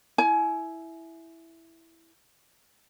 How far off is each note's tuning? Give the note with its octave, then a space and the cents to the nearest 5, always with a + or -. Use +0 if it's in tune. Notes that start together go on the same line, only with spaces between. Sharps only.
E4 +0 G#5 +30